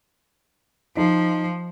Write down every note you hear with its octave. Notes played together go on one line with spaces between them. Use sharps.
F3 D#4